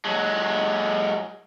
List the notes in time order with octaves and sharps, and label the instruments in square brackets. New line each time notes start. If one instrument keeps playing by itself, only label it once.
[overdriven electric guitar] F#3 G#3